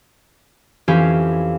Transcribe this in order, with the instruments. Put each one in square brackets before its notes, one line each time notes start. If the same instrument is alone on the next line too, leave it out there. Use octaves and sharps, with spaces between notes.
[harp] F2 E3 C#4 G4 F5